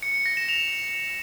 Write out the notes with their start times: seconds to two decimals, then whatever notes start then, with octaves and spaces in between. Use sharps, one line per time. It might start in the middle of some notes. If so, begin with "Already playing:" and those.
0.03 C#7
0.14 C#7
0.26 A#6
0.37 E7
0.49 F7